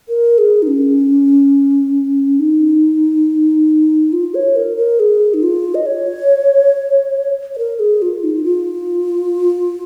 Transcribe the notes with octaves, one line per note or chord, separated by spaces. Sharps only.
A#4
G#4
D#4
C#4
D#4
F4
C#5
A#4
A#4
G#4
D#4
F4
D#5
C#5
C#5
A#4
G#4
F4
D#4
F4